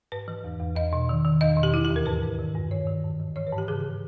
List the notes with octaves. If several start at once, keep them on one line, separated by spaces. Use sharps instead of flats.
G#2 B4
E3
E2
E2
E2 D#5
B2
D#3
D#3
E2 D#5
B2
G4
E3 E4
G4
D#2
A#4
G#2 B4
G#2
D#3
G2
D#3 C#5
D#3
G#2
E3
E3 C#5
B4
G#2
G4
C#3 G#4